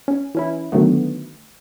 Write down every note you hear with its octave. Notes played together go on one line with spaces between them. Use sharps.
C#4
E3 C#4 E4
D3 D#3 F#3 A3 B3